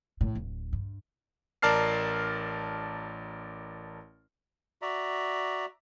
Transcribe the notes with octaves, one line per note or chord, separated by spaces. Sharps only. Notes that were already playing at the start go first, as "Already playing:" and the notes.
A2
D1
G2
A1 A#4 D5 A5 F6 C7
F#4 D5 E5 A#5